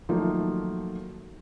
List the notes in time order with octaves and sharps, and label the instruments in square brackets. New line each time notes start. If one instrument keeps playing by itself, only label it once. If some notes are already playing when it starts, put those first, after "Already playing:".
[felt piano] D#3 F3 F#3 A3 A#3 A4